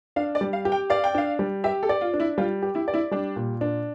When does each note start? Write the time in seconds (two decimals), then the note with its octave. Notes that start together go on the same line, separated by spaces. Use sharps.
0.16 D4 F5
0.35 D5
0.41 G3
0.53 F5
0.65 G4
0.72 G5
0.90 D5 F5
1.04 G5
1.15 D4 F5
1.39 G3
1.64 G4 E5
1.83 A4
1.89 D5
2.01 F4
2.14 D4
2.20 E4
2.38 G3 F4
2.62 G4
2.75 E4
2.88 D5
2.94 E4
3.11 G3 D4
3.36 A#2
3.61 D4